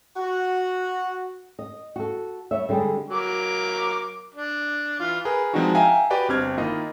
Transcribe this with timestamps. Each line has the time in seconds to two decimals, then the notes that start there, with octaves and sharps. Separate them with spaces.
0.16 F#4
1.59 D#5
1.96 F#4 A4
2.51 G2 C#5 E5
2.69 D3 G3 G#3 C4 G#4
3.10 F#3 A#4 D6
4.34 D4
4.99 E3 F4
5.25 G#4 A#4 B4
5.54 F3 G#3 C4 D4 D#4 F#4
5.75 E5 F5 G5 G#5 A#5
6.10 F#4 G4 B4 D5 D#5 G5
6.29 G1 C4 D4 F6 G#6
6.58 D#3 A#3 E4 F4 D#5